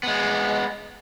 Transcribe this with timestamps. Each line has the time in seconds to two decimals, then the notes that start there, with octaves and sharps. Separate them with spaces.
0.03 G#3 B3